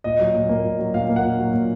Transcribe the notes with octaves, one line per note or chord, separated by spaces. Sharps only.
A#2 D#5
F#3
A#2
A#3
A#2
F#3
A#2 F5
A#3
F#5
A#2
F#3
A#2